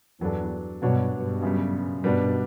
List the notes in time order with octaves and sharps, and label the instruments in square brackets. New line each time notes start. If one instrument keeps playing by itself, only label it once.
[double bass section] E2 G2 [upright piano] F#3 B3 D4 A4
[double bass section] G2 B2 [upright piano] F#3 B3 D4 F#4 C#5
[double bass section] G2 B2
[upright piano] F#2 C#3 G3
[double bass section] G2 B2 [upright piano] G3 B3 D4